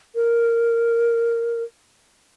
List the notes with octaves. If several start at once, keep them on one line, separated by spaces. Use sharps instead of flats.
A#4